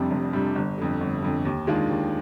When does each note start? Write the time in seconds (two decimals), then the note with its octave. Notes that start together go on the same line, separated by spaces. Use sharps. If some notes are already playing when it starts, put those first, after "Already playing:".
Already playing: F1 F2 C3 G3 D4
0.11 F1
0.33 F2 C3 G3 D4
0.55 G1
0.78 F2 D3
1.01 G1
1.22 F2 D3
1.45 D#2
1.67 D#3 G#3 D4 F4
1.89 D#2